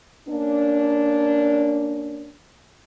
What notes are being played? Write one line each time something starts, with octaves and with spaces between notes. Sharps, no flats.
A#3 C#4 D4